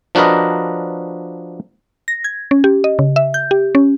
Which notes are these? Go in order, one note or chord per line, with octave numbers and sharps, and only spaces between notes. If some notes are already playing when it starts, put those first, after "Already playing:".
F3 D4 F#4 A#4 B4 D#5
A#6
G#6
C#4
G4
D#5
C#3
E5
G6
G4
C#4